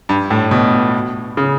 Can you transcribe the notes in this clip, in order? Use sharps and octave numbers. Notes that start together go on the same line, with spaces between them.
G2
A2
B2
C#3